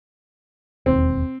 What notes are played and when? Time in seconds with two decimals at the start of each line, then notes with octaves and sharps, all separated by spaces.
0.86 E1 D#2 C4